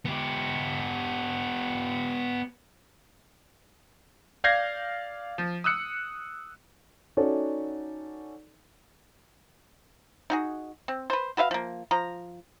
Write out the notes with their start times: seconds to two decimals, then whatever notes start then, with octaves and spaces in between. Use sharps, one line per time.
0.06 B3 G4
4.44 D5 F5 G6 G#6 A#6 C7
5.38 F3
5.64 D#6 E6 F#6 C#7
7.17 C#4 D#4 F#4 A4 D5
10.30 D#4 F#4 G#4
10.88 C4
11.10 B4 C5
11.37 F#4 B4 E5 F5
11.51 F3 A#3
11.91 F3 A#5